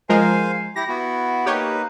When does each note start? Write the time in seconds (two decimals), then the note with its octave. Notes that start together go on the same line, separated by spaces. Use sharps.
0.09 F3 G#3 A#4 C5 F5 G#5
0.76 E4 G4 A#6
0.88 B3 E4 F#4
1.46 A#3 D#4 G4 B4 C#5